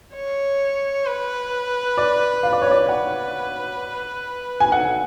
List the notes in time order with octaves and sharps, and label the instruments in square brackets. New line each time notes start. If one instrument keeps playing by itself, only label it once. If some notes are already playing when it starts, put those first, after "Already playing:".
[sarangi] C#5
B4
[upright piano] D5
F5
D5
C#5
D5
[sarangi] B4 [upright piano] F#5
[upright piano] G#5
[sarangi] A4 [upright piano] F#5